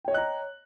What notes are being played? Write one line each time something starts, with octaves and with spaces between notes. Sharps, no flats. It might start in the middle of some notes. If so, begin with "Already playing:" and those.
C#5 D#5 G5 A#5 F#6